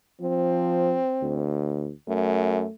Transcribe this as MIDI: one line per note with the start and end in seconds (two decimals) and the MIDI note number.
0.21 0.99 53
0.21 1.55 60
1.22 1.92 38
2.08 2.63 42
2.08 2.72 57